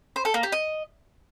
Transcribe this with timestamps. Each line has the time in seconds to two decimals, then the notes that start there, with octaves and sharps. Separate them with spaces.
0.16 C5
0.25 A4
0.34 A#3
0.43 G4
0.52 D#5